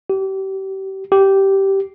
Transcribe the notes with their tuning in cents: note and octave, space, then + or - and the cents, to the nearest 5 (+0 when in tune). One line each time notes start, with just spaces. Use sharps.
G4 -30
G4 -10